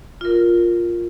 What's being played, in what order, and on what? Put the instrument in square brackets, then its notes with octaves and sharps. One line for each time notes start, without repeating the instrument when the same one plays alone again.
[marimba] F4 A#4